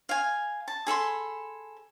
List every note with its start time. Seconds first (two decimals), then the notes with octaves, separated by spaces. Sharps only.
0.09 F5 G#5
0.68 A5
0.87 G#4 A4 B5 C6